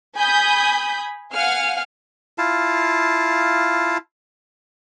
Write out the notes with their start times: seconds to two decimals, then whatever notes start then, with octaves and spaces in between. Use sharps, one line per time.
0.14 G#5 B5 D#6 G6
1.32 F5 F#5 G#5 F6
2.38 E4 F4 F5 A5